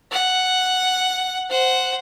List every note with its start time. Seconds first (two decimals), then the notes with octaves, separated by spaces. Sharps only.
0.11 F#5
1.50 C5 F#5